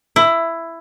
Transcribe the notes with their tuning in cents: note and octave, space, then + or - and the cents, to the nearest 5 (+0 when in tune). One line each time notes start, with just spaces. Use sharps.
E4 +10